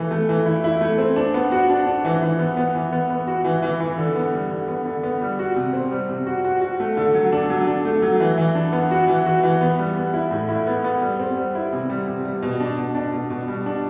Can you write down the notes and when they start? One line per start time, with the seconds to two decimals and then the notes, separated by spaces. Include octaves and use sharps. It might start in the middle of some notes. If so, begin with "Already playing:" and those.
Already playing: E3 A3
0.11 A3
0.29 E3
0.46 E4
0.64 E4
0.81 A3
0.98 C4
1.16 D4
1.34 B3
1.52 F#4
1.70 D4
1.86 D4
2.05 E3
2.22 E3
2.39 B3
2.57 B3
2.75 E3
2.92 B3
3.10 B3
3.27 F#4
3.45 E3
3.62 E3
3.80 E3
3.98 D3
4.15 B3
4.33 G3
4.51 D3
4.68 B3
4.85 D3
5.03 B3
5.21 G3
5.39 F#4
5.56 C3
5.73 C4
5.91 G3
6.09 C3
6.26 F#4
6.45 F#4
6.61 F#4
6.80 A3
6.97 D3
7.14 F#3
7.32 D4
7.50 F#3
7.67 D4
7.85 A3
8.02 F#3
8.20 E3
8.38 E3
8.55 D4
8.73 B3
8.91 F#4
9.08 E3
9.26 F#4
9.43 E3
9.61 B3
9.79 G3
9.97 B3
10.14 E4
10.31 A2
10.49 E4
10.67 B3
10.84 B3
11.01 G3
11.19 C4
11.37 G3
11.55 E4
11.73 C3
11.90 G3
12.08 C3
12.25 G3
12.42 B2
12.60 D4
12.78 B2
12.95 D4
13.13 B2
13.30 B2
13.48 G3
13.66 D4